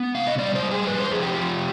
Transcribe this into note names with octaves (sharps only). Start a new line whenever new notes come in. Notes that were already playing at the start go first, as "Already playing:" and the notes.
Already playing: B3
C3 F5
D#5
G3 D5
C5
G3
G#4
F2 B4
C5
F2 G#4
G4
F3